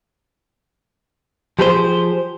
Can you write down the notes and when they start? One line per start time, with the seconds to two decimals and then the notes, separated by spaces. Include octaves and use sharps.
1.59 F3 G4 G#4 B4 C5